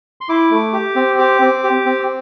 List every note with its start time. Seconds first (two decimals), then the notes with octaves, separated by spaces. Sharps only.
0.21 C6
0.29 E4 D6
0.51 A3
0.73 G4
0.95 C4
1.19 G4 D6
1.42 C4
1.64 G4
1.86 C4